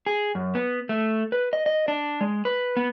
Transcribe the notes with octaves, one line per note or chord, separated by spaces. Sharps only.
G#4
F#2
B3
A3
B4
D#5
D#5
D4
G#3
B4
B3